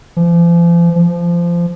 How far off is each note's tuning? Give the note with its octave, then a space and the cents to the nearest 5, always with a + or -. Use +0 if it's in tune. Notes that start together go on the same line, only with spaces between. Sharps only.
F3 -40
F3 -20